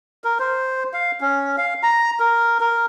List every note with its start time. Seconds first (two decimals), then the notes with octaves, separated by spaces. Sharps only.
0.24 A#4
0.39 C5
0.93 F5
1.21 C#4
1.58 F5
1.83 A#5
2.20 A#4
2.60 A#4